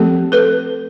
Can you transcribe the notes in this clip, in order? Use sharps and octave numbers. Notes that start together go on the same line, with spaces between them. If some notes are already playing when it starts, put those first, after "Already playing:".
Already playing: F3 A3 C4 G4 A4
A4 B4